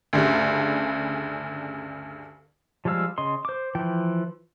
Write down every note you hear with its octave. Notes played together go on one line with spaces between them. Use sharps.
D2 G2 C#3
F3 G3 G#3 F5 E6
C#3 D#5 C6
C5 D6
E3 F3 G5